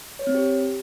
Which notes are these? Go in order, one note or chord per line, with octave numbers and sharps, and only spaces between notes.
C#5
C4
G4